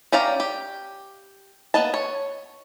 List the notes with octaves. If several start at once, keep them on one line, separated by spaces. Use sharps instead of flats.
C#4 G4 D5 F5 A#5
G4
A#3 B3 D#5 A5
C#5